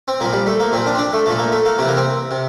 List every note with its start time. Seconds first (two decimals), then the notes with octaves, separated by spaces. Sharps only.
0.08 C4
0.20 A#2 F3 A#3
0.33 G3
0.46 A3
0.60 A#3
0.72 A#2 F3 C4
0.86 D4
0.95 C4
0.98 D4
1.13 A3
1.26 A#2 F3 A3
1.38 A#3
1.52 A3
1.65 A#3
1.78 C3 E3 C4
1.88 A#3
1.97 C4
2.31 C3